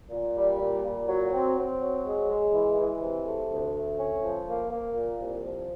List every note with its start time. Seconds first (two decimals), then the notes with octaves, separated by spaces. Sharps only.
0.11 A#2
0.36 G3
0.60 A#2
0.84 A#2
1.08 F#3
1.32 C4
1.56 C4
1.81 F#3
2.05 G#3
2.28 G#3
2.53 E3
2.78 E3
3.01 C3
3.25 A3
3.49 D2
3.73 A3
3.97 C#4
4.22 F3
4.47 A#3
4.70 A#3
4.95 A#2
5.19 C2
5.44 F3